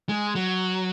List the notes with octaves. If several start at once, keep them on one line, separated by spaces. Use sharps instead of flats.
G#3
F#3